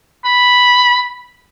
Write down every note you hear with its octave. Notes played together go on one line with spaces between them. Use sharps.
B5